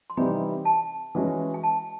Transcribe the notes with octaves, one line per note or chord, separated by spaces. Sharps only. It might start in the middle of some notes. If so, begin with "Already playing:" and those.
C6
C3 E3 G3 C4 D#4 B5
A5
E3 G#3 C#4 F#4
G#5
A5